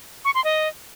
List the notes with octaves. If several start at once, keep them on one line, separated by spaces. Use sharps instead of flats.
C#6
C6
D#5